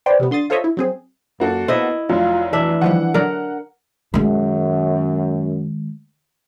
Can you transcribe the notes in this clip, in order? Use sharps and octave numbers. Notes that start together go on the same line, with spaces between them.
B4 C5 D5 G5
C3 G3 B3
D3 C6 D#6 A6
F4 A4 C5 C#5 D#5 E5
E4
F#3 C4 G#4
F#2 A#3 F#4 A4
B3 E4 C5 D#5 E5
F1 F#3 F4
E3 D4 E5
D#3 F3 G3 F#5
D3 F#3 A#4 D5
F#2 D#3 G#3